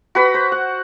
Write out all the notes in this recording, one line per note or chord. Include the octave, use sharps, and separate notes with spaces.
F#4 B4 B5
C5
F#5